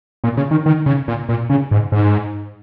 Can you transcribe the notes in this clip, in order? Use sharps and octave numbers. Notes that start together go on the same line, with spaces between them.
A#2
C#3
D#3
D#3
C#3
A#2
A#2
C#3
G#2
G#2